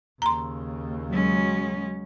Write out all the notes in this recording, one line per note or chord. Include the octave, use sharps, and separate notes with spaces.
D#2 C#3 A#5 C6
F#3 G#3 C#4